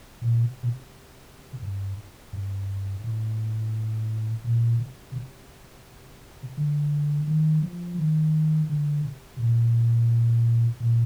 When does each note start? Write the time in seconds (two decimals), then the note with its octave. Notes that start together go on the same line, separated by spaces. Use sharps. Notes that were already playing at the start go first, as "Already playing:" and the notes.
0.22 A#2
0.44 C3
0.63 A#2
0.68 C3
1.62 G2
2.33 G2
3.04 A2
4.44 A#2
4.80 C3
5.15 C3
6.57 D3
7.27 D#3
7.62 F3
7.98 D#3
8.69 D3
9.05 C3
9.39 A#2
10.80 A#2